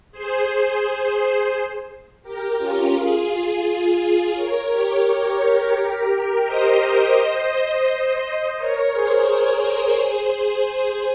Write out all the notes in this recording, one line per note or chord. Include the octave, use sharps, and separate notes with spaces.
G#4 C5
G4 A#4
C#4 F4
F4 G#4
A#4 C#5
G4 A#4
C5 D#5
A#4 C#5
G#4 C5
G#4 C5